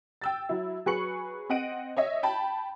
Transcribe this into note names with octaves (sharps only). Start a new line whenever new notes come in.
G5 E6 A6
F#3 E4
F#3 G#4 B4 C#6 C#7 F#7
C4 D#5 F#5 D7 D#7
C#5 D#5 E5
G5 A5 B5